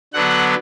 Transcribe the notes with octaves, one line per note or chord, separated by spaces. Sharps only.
D3 F#3 B3 D4 F#5